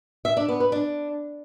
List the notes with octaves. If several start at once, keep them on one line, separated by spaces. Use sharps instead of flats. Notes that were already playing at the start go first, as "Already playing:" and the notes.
E5
D4
B3
B4
D4